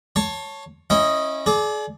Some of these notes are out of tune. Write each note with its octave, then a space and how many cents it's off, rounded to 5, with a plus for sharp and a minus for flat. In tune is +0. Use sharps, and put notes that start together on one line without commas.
C#5 +0 A5 +5 C6 +35
C#4 -25 E4 +0 D#5 +0
G#4 +40 D5 +0